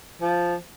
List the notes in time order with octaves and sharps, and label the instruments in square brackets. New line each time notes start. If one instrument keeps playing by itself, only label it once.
[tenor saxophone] F3